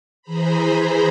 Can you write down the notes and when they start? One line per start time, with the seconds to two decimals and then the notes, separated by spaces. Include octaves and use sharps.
0.22 E3 G#4 C5 A#5 B5